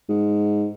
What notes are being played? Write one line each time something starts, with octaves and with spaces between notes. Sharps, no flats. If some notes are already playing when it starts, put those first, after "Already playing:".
G#2